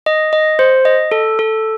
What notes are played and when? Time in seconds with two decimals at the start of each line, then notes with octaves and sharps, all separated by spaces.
0.06 D#5
0.33 D#5
0.59 C5
0.85 D#5
1.11 A4
1.39 A4